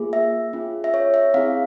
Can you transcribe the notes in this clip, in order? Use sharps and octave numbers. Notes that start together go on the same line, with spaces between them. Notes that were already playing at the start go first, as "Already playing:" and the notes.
Already playing: A#3 F4 G#4
E5
C#4 F4 G#4
E5
C#5
E5
C4 E4 G#4 F5